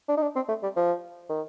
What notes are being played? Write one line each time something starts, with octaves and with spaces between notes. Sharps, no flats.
D4
D#4
D4
C4
A3
G3
F3
D#3